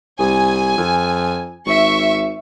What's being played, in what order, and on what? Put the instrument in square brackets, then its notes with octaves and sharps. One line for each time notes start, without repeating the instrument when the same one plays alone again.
[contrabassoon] C2 [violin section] G#5
[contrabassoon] F2
[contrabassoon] G#1 [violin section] E5 C#6